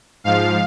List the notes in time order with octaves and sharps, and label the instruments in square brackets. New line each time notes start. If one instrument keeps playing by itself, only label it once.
[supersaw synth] G#2 F3 F5